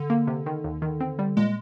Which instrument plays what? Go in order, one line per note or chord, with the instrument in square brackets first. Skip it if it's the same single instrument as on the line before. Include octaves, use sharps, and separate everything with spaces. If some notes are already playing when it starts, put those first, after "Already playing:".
Already playing: [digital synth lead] D3
[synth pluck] A#3
C3
D#3
D#2
D#3
C4
G3
[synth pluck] A#2 [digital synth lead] G#3